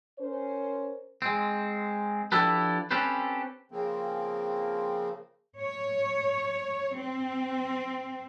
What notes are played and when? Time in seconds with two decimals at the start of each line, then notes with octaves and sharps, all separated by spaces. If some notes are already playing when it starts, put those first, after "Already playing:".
0.19 C#4 A#4 C5
1.22 G#3 C4
2.32 F3 D4 E4 G4 A4 B4
2.91 C4 C#4 G4 A4 B4 C5
3.72 C#3 F3 A#3 C4
5.60 C#5
6.96 C4